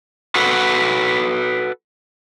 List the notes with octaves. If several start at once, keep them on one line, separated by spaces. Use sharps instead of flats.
F#4 A4 B4